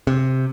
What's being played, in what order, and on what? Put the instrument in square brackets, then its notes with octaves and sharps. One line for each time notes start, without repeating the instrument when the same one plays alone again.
[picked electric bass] C3